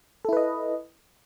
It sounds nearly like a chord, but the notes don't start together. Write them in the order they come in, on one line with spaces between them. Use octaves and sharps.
A4 E4 B4 D#5